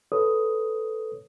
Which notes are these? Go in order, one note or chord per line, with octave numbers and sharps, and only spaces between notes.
A4 B4 C#5 D#6